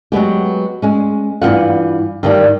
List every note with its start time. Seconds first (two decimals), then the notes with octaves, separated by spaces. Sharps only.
0.12 F#3 G#3 B3 G4
0.82 G#3 C#4
1.42 G2 E3 F3 F4 F#5
2.23 G2 D#3 G3